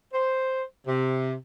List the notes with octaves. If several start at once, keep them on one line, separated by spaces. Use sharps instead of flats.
C5
C3